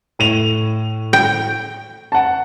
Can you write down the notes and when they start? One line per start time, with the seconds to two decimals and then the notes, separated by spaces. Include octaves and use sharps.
0.19 A2 D#7 F7
1.13 G5
2.12 F#5 A5